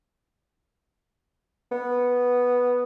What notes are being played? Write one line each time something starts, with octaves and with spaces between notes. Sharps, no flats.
B3